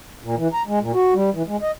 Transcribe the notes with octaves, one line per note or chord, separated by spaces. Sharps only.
A#2
E3
A#5
G#3
A#2
F#4
G3
E3
G#3
D#5